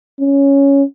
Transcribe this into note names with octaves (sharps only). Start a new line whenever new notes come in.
C#4